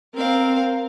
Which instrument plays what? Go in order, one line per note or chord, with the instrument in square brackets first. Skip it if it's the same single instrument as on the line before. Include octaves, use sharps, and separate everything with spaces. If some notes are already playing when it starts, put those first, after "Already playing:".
[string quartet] C4 A#4 F5